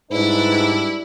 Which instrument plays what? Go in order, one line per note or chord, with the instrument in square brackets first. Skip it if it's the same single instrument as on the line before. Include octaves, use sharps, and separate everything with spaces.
[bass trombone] G#2 [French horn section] G3 D4 [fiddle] E4 [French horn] B4